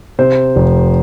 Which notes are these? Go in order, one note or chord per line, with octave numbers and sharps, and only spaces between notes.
C3 C5
F1